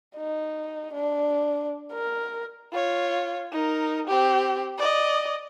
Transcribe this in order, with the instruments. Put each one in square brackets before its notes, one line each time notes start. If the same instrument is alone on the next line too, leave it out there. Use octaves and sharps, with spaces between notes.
[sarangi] D#4
D4
A#4
[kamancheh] F4 C#5
D#4 A#4
C4 G4
D5 D#5